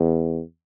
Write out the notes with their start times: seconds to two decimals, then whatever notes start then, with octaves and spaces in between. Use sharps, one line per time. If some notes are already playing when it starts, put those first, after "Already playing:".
Already playing: E2